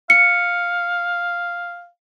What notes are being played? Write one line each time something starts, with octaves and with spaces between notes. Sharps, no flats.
F5 C#7